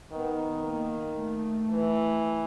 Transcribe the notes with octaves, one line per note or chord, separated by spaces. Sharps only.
D#3 B3
A#3
A3
E3